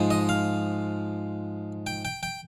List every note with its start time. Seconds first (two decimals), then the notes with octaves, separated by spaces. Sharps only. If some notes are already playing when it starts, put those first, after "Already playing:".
Already playing: G#2 F3 G#3
0.11 D#5
0.29 F5
1.87 G5
2.05 G5
2.23 G5